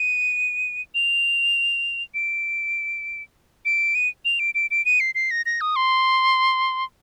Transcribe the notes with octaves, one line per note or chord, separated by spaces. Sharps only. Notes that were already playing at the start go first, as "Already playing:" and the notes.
Already playing: D#7
F7
D7
D7
D#7
F7
D7
D7
D7
D#7
C7
C7
A#6
A#6
D#6
C6